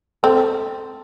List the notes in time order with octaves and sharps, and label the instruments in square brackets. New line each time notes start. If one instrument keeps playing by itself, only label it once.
[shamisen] C4 [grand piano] A4